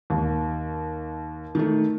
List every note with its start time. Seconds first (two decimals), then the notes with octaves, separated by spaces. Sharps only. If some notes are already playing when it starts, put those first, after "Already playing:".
0.10 D#2
1.55 D#3 A3